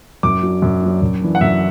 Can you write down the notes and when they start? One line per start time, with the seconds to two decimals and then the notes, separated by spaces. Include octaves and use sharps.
0.23 F#2 D6
0.43 F#3 D4
0.62 F#2
0.82 F#3 D4
1.02 F#2
1.21 E3 D4
1.35 F#5
1.41 F#2 E5